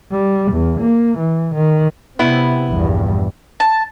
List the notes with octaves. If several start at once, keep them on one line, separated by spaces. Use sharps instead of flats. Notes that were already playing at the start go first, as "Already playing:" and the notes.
G3
E2
A#3
E3
D#3
C3 B3 E4
A#1 E2 G2
A5